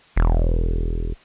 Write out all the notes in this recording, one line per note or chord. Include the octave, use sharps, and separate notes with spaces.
E1